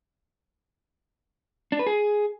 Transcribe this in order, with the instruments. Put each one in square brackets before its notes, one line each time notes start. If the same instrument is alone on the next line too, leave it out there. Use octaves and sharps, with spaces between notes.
[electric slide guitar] D4
B4
G#4